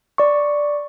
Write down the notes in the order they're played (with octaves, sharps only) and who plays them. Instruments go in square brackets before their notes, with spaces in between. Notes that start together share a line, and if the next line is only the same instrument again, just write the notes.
[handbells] D5 C#6